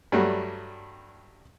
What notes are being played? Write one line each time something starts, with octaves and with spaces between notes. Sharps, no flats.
G2 F#3 G3 A3